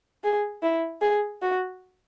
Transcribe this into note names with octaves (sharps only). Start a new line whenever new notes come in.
G#4
E4
G#4
F#4